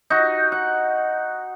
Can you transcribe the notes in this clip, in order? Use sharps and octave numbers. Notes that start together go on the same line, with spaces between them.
D#4 F#4
F#5